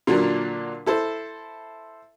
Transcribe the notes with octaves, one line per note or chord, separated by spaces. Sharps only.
A#2 D3 F#3 A#3 D4 A#4
E4 A4 C5